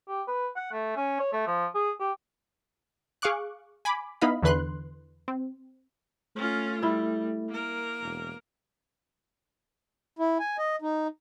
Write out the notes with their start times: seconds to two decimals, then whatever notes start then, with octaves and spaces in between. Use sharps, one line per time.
0.08 G4
0.27 B4
0.56 F#5
0.72 A3
0.96 C#4
1.20 C#5
1.33 A3
1.47 F3
1.75 G#4
2.00 G4
3.22 G#4 F5 C#6 D6 F#6
3.85 G#5 B5 D6
4.22 B3 D#4 E4 D#5 F5 B5
4.43 E2 D3 E3 B4 C6 F#6
5.28 C4
6.36 A3 C#4 F4
6.83 G3 E4
7.49 A#3 A#4
8.02 E1
10.19 E4
10.39 G#5
10.58 D#5
10.82 D#4